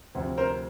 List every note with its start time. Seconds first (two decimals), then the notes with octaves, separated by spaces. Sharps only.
0.15 D2 C3 F3 A3 C4
0.38 A#4 C5